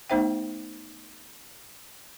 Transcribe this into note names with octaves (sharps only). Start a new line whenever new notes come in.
A3 B3 D#4 C5 E5 G5